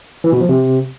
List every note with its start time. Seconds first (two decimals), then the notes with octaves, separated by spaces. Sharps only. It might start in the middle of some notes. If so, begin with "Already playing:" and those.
0.24 E3
0.32 B2
0.41 F3
0.49 C3